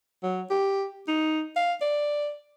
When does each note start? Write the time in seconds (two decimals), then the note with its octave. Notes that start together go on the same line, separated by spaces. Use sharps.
0.23 F#3
0.50 G4
1.08 D#4
1.56 F5
1.82 D5